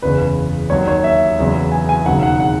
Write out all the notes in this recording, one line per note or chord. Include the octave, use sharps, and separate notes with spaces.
F#1 E2 C#3 B4
D#2 D#3 F#3 C#5
C#5
E5
E2 C#3 F#3
G#5
G#5
E1 D#2 C#3 F#3 F#5
F#5
F#5